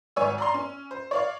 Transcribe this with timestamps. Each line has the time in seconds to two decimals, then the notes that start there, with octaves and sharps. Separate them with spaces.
0.16 G#1 C#5 G#5 E6
0.38 D5 A#5 C6
0.54 C#4
0.91 C5
1.11 C#5 D5 F5